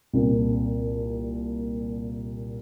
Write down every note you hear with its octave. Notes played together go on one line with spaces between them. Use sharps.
C2 A#2